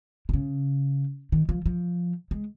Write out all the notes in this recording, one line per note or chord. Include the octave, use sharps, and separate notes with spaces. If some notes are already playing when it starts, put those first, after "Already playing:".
C3
C#3
D#3
F3
F3
G#3